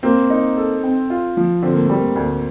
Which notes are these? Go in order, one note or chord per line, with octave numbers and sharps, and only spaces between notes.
A#3 C4
D#4
A4
C4
F4
F3
D3 C4
A#3
G3 A3
A#3
D2